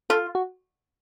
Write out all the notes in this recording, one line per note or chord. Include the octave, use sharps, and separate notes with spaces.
F4 A4
F#4